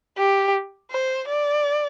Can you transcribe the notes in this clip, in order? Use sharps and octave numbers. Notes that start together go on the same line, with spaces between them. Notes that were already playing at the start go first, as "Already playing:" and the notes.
G4
C5
D5